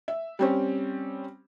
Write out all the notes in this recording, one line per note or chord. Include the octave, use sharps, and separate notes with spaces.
E5
G3 C4 C#4